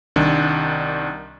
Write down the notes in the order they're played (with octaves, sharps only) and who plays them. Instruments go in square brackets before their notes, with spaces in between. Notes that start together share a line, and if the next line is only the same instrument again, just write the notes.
[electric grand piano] C2 D#3 D4